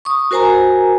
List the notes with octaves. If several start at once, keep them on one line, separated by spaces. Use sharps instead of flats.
C#6 D#6
F#4 A#4 C5 G#5 A#5